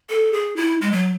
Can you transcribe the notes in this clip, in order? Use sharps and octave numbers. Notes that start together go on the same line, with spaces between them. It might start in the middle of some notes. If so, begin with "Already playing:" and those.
A4
G#4
E4
G#3
F#3